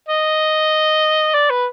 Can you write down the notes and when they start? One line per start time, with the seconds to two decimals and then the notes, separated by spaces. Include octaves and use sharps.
0.08 D#5
1.34 D5
1.50 B4